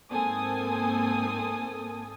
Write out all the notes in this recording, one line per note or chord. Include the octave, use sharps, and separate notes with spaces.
G#2 A#3 C4 A4 G#5 D#6